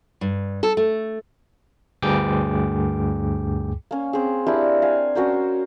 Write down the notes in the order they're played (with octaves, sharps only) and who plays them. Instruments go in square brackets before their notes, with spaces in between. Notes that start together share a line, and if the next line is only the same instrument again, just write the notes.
[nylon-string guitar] G2
A4
A3
[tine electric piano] D2 G2 G#4 G5 D6
[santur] A#3 C#4
C4 G#4
D4 E4 G4 A#4
F5 G#5
C#4 F#4 A#4 C5